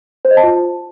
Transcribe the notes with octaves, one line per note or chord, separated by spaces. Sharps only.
C5
D#5
A5
F4